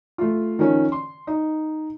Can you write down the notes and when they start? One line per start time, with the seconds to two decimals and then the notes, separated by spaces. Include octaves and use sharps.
0.18 A3 F4
0.59 D#3 F3 C#4
0.92 C6
1.27 D#4